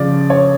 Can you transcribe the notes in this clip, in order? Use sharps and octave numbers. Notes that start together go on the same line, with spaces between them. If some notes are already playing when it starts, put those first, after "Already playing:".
Already playing: C#3 F3 D5
C#5